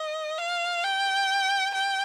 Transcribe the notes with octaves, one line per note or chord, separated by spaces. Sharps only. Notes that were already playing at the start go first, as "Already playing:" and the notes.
Already playing: D#5
F5
G5
G5